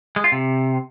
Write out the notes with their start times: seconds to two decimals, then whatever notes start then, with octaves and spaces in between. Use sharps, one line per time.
0.16 G#3
0.24 F4
0.32 C3